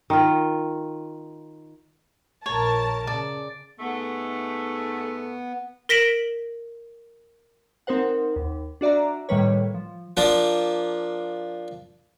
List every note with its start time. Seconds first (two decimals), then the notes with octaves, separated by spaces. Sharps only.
0.10 D#3 F4
2.46 A#1 A#4 C#5 A5
3.07 C#3 D5
3.80 G#2 A3 B3
5.89 A#4 A#6 B6 D7 E7 F#7
7.87 C4 D#4 A#4 C5 F#5
8.36 D#2
8.81 D4 F#4 D5 E5 A#5
9.29 A2 D#3 G3 A#3 B4 C#5
9.74 F3
10.17 F3 A#3 D4